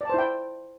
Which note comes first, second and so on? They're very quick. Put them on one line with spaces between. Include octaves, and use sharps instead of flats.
D5 A5 C5 E4 G5